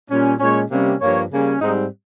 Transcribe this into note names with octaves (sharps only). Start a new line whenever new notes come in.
A#2 G3 C#4
A#2 G#3 C#4 C#5
C3 G3 A#3 C#4
G2 F3 A#3 C#5
C#3 G3 A#3 C#4
G#2 G3 C4 D#4